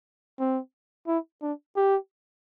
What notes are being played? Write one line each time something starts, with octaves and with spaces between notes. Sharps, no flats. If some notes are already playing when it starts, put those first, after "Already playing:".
C4
E4
D4
G4